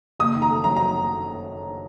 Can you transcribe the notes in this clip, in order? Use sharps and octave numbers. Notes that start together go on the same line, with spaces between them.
F#1 D#6
D#3
A#5
A3
F#2 A#5
A#5